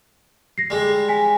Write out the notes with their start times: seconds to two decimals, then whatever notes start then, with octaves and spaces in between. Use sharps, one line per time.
0.58 A#6 C7
0.70 G3 G#3
1.09 G#5 B6